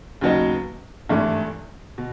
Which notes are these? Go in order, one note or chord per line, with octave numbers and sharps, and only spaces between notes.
D#2 C#3 F#3 B3 D#4
G#1 G2 E3 A3
B2